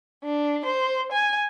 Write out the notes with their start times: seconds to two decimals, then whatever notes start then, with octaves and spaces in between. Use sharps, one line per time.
0.24 D4
0.65 C5
1.12 G#5